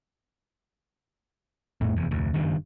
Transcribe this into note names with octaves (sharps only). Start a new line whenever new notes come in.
A#1 F2 A2 A3
F1 E2
F1 D2
F#1 G2 D#3